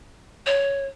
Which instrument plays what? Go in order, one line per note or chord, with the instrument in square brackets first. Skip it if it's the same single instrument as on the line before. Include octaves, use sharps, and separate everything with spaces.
[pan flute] C#5